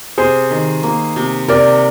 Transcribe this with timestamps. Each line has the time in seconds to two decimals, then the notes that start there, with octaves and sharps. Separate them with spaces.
0.18 C3 G#4 C5
0.51 D#3
0.83 A#3
1.16 C3
1.48 C3 A#4 D5